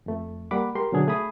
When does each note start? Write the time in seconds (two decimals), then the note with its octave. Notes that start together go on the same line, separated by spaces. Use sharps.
0.06 F2 A3
0.51 G3 A#3 F#5 B5 D6
0.75 G#3 G4 A#4 C6
0.92 B2 D3 F#3 D4 G#4
1.07 A3 G#4 G#5 B5 D#6